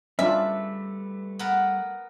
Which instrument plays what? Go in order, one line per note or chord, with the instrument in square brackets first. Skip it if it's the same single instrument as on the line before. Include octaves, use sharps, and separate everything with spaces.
[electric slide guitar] G3 A3 B4 [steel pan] C#4 D4 F4 [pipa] E5
[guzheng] B3 A#4 F#5